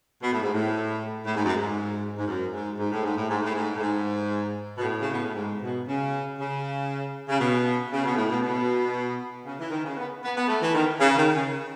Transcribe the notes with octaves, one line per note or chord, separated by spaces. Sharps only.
B2
A2
G#2
A2
A2
G#2
F#2
G#2
G#2
F#2
G#2
G#2
A2
G#2
A2
G#2
A2
G#2
A2
G#2
B2
A2
C#3
B2
A2
G#2
B2
C#3
C#3
C#3
B2
C#3
B2
A2
B2
B2
C#3
E3
D#3
C#3
B3
B3
B3
A3
E3
D#3
C#3
D#3
C#3